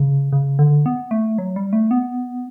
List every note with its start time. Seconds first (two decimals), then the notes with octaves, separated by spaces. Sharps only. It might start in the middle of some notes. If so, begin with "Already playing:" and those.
Already playing: C#3
0.32 C#3
0.59 D3
0.86 B3
1.11 A3
1.38 F#3
1.56 G3
1.73 A3
1.91 B3